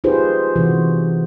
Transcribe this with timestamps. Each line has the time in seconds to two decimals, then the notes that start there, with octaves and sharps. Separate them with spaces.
0.04 D#4 F4 G4 G#4 B4 C5
0.56 C3 E3 D#4 F#4